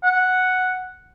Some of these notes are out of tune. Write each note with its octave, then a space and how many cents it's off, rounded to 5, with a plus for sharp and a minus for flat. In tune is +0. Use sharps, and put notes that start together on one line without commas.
F#5 +0